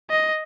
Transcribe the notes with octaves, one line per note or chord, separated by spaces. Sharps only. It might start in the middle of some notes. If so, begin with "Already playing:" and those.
D#5